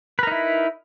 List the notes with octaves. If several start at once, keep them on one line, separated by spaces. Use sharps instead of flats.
D#4 E4 A#4 B4